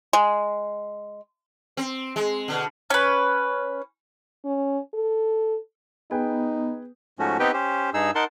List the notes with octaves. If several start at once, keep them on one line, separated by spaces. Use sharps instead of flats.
G#3
C4
G#3
B2 D3
C#4 B4
C#4
A4
B3 D#4 G#4 B4 G5
G#2 F3 A3 C#4 F#4
B3 C4 D#4 G4 B4 G5
C#4 G4 C5
G2 D#4 G#4 E6
D#4 A#4 F#5 A5 C6